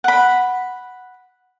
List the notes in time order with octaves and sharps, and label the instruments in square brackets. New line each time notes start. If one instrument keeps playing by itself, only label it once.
[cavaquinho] F#5 B5